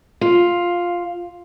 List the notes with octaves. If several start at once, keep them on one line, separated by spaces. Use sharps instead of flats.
F4